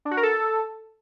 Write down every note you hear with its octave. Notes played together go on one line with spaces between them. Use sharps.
D4
F#4
A#4
A4